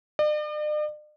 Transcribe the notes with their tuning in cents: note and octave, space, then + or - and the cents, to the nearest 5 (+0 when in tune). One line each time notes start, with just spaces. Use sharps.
D5 +45